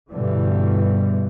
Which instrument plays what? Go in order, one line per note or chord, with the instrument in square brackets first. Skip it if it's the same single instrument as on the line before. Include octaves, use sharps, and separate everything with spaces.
[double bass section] G2 B2 D3 E3 G3